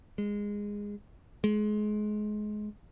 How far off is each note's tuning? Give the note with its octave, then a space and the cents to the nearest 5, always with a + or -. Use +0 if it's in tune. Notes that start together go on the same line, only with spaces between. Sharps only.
G#3 -15
G#3 +25